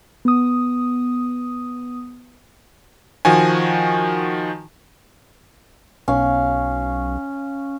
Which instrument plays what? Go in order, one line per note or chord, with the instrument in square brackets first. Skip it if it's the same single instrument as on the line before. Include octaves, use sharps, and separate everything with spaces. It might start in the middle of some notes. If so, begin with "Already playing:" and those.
[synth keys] B3 D#6
[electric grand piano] D#3 F3 F#4 G#5
[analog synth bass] B1 [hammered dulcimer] C#4 F5